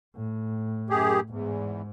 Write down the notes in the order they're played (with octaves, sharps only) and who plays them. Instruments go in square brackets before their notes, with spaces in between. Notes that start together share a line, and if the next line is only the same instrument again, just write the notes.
[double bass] A2
[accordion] F#2 G4 G#4
[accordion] E2 [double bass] G#2